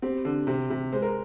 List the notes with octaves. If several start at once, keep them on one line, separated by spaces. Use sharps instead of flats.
C4 G4
D3
C3
C3
G#3 C5
A#4